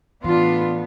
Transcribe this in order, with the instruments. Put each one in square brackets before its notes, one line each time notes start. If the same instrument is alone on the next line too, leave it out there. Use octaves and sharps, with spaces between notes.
[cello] A2 B3 [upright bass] E3 [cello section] D4 F4